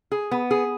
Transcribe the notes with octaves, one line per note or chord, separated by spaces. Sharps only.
G#4
B3
G#4